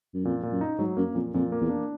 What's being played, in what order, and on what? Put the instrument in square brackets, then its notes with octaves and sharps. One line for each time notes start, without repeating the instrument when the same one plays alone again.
[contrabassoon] F#2
[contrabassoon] F2 [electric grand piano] A#2
[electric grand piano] A#2
[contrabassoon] F#2
[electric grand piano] D#4
[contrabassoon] G#2 [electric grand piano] F#3
[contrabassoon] F#2 [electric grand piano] A#3
[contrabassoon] F2 [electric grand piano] A#2
[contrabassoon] F2 [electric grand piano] A#2
[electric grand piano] A#3
[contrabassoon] E2
[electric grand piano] D4